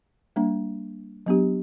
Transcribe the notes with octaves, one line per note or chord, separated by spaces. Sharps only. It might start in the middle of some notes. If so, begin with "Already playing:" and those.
G3 A#3 D4
F#3 B3 D4 G4